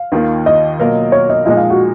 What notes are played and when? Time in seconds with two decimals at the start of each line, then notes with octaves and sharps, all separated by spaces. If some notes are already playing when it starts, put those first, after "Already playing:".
Already playing: F5
0.12 D#2 D#3 A#3 F4
0.46 D#5
0.79 B2 F#3 A#3 F4 A#4
1.12 C#5
1.30 D#5
1.45 A#2 F3 G#3 D#4 D#5
1.57 F5
1.70 F#4